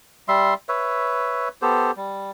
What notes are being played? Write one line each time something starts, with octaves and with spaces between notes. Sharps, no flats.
G3 E5 C6
B4 C#5 E5
B3 G4 A4 C5
G3